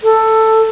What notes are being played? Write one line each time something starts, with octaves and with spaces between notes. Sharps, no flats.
A4